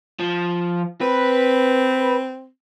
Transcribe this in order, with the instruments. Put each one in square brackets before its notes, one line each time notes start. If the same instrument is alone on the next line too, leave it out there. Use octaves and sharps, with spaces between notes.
[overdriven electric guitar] F3
[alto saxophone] C4 [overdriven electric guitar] B4